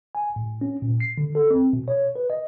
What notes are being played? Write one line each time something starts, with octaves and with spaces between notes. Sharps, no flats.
G#5
A2
C#4
A#2
C7
D3
A4
C4
B2
C#5
B4
D#5